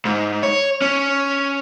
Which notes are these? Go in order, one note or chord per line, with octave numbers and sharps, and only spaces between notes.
G#2
C#5
C#4